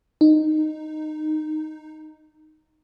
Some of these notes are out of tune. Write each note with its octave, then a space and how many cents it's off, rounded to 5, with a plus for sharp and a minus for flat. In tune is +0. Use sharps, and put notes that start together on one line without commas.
D#4 -10